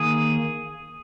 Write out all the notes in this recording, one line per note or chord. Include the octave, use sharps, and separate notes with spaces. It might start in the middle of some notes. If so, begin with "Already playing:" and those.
Already playing: D#3 A#3 G#4